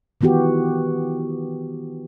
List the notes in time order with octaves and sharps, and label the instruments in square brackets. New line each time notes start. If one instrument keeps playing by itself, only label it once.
[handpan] D#3 E3 B3 F#4 G4